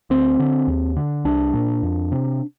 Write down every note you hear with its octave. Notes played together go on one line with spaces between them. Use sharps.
D2 C4
D3
D#2
D3
C2 D4
A#2
F2
C3